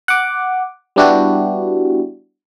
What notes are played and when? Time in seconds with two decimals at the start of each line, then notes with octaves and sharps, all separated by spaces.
0.08 F#5 D6
0.96 G3 B3 D4 E4 F#4 G4